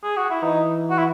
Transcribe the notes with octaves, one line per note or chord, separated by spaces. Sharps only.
G#4
F#4
E4
E3 D#4
F#4
E4